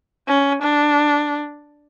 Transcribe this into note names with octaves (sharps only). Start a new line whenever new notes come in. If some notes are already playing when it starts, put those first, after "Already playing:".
C#4
D4